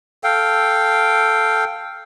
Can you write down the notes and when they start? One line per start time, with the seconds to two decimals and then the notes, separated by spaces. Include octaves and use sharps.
0.24 A4 F5 G5